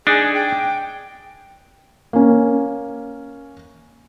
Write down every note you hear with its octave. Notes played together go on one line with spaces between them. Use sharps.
D4 D#4 G#4
G5
A#3 C#4